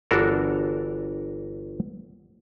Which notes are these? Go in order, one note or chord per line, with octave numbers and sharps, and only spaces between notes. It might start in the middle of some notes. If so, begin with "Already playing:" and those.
G1 E3 D4 F#4 A4 A#4